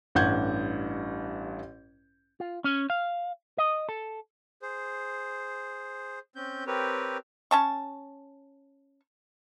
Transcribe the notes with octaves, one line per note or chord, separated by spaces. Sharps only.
A1 G2 F#5 G6 G#6
F4
C#4
F5
D#5
A4
G#4 C5
C4 C#4 G6
C4 G4 A#4 B4 C#5
C#4 A5 C#6